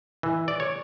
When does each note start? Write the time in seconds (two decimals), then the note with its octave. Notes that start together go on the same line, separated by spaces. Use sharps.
0.23 E3
0.48 D5
0.60 C#5